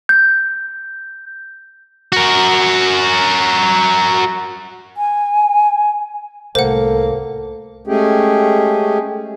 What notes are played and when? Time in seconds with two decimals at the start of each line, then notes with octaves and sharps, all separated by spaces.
0.09 G6
2.12 F#4 A#4
4.97 G#5
6.55 C2 A2 A#3 A4 C5 F#5
7.87 G#3 A3 C#4 G4 G#4